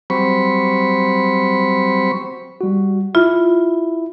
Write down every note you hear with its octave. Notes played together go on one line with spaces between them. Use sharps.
F#3 G3 C4 C5 B5 C#6
G3 F#4
E4 F4